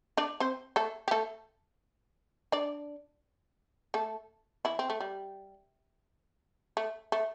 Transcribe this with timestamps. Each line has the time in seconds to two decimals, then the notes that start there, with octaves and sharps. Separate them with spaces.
0.17 D4 D5
0.40 C4 C5
0.76 A3 A4
1.08 G4
1.11 A3 A4
2.52 D4 D5
3.94 A3 A4
4.65 E3 E4
4.79 C4
4.90 A3
5.00 G3
6.77 A3
7.12 A3